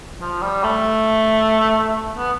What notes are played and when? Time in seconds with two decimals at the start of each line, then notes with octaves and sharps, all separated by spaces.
0.20 F3
0.42 G3
0.64 A3
2.17 B3